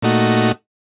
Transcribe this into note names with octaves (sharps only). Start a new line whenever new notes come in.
A#2 A3 D#4 F#4